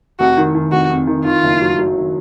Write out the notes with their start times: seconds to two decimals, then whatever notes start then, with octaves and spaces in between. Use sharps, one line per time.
0.20 F1 F#4
0.37 D#3
0.55 D#3
0.72 F1 F#4
0.90 F2
1.07 D#3
1.25 D#3 F4
1.43 F#1
1.61 F#3
1.79 F#3
1.96 D#3